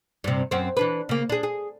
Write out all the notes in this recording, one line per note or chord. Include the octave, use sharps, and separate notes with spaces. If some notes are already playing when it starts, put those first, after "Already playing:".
G2 C3
F#2 C4
E3 D4 B4
C#3 A#3
D4 G#4
G#4